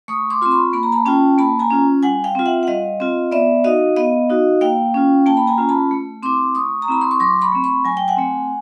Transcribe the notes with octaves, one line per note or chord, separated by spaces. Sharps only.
A3 C#6 D#6
C6 D6
C4 F4 C6
B5 C#6
A#3 B5
A#5
A5 B5
C#4 F4 G5 A5
A#3 A5 B5
G#5 A#5
C#4 F4
G3 F#5 G#5
F5 G5
C4 F4
E5 F#5
F#5
G3 D#5 F5
C4 F4
B3 D5 E5
D#4 F#4 D#5 F5
B3 D#5 F5
D#4 F#4
A#3 F5 G5
C#4 F4
A#3 G5 A5
B5
G#5 A#5
C#4 F4
A5 B5
A3
C4 E4 C6 D6
A3 C#6 D#6
A#5
C4 E4 B5
C6
C#6
F#3 C6 D6
B5 C#6
A3 C4
B5 C#6
F#3 G#5
G5
F#5 G#5
A3 C4